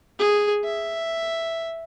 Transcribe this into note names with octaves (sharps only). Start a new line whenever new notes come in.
G#4
E5